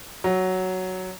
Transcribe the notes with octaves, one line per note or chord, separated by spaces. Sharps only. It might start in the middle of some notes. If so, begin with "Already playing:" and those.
F#3